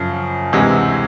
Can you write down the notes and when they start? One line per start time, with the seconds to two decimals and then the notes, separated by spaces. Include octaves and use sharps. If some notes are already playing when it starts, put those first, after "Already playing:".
Already playing: F#2 C#3 F3
0.53 D2 C3 E3 G#3